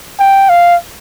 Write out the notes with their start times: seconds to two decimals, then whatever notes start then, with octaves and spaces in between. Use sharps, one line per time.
0.19 G5
0.49 F5